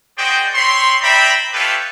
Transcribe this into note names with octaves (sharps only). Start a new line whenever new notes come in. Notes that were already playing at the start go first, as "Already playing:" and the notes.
F#4 G#4 C5 D5 D#5 G5
C4 C#5 B5 C6
C5 D5 E5 G5 A#5 B5
F4 G4 A4 B4 C#5 E5